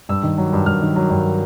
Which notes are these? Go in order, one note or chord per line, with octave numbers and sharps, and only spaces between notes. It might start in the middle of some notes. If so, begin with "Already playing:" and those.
G2 E6
D#3
F#3
G2
G2 F6
D#3
F#3
G2